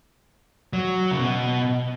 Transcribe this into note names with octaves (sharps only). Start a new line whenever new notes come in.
F#3
C#3
B2